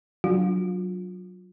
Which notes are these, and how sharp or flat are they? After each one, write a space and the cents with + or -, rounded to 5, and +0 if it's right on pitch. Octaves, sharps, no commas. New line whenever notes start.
F#3 +0 D4 +0 F4 +30